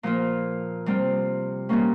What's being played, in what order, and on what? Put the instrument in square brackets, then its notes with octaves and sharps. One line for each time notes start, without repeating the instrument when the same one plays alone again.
[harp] A#2 F3 A#3 F4
C3 G3 C4 F4
A#2 G3 A#3 C#4